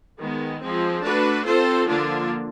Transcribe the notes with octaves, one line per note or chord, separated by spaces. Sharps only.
D#3 G#3 B3
F3 G#3 C4
A3 D4 F#4 B4
C4 F4 A4 C5
D3 F3 A#3 D4 F4